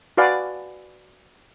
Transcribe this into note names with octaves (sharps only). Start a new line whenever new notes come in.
F#4 B4 D5 F5 F#5 G#5